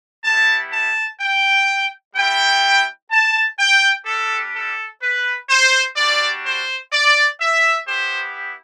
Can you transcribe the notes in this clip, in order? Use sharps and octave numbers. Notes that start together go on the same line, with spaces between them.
G3 B3 E4 A5
A5
G5
G3 B3 E4 G5
A5
G5
G3 D4 G4 A4
A4
B4
C5
G3 D4 F#4 D5
C5
D5
E5
B3 E4 G4 C5